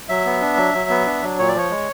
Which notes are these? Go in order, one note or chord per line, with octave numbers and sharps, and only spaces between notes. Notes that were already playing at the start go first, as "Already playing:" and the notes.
F#3 E5
B3
D4
F#3
F#3
B3
D4
F#3
A#2 C#5
D5
F3 C#5
G#3